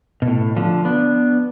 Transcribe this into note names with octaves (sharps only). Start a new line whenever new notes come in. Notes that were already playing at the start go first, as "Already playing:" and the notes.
B2
A2
D3 F3
B3 D4